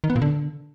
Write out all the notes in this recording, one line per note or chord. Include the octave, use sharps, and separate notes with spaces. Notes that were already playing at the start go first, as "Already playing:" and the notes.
D#3
B3
A#2
D3